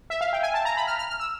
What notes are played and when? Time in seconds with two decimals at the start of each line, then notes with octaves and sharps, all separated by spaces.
0.10 E5
0.21 F5
0.33 G5
0.43 G#5
0.54 A5
0.65 A#5
0.77 B5
0.87 F6
0.99 F6
1.10 F6
1.20 E6